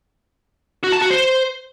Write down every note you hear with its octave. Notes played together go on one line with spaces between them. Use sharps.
F#4
A5
F#4
C5